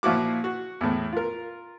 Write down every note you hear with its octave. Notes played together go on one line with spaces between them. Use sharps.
A#2 F3 E4 F#4 D6
F#4
E2 A2
F4 A#4